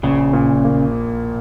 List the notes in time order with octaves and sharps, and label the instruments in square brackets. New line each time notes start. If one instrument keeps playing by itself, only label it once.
[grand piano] A#1 [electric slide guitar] C#3
[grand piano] A#2
A#3